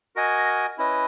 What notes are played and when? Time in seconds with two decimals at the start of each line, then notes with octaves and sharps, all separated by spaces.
0.16 F#4 A#4 D#5 G#5
0.78 C#4 E4 B4 D#5